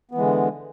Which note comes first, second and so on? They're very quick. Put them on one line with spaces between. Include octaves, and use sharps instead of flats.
B3 E3 G#3 D3